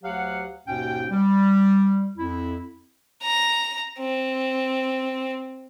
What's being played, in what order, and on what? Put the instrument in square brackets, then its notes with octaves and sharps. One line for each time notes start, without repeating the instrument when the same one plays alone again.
[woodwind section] D2 F#3 G4 F5 F#5
D#2 G#2 B2 C#4 G5
G3
F2 E4
[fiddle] A#5
C4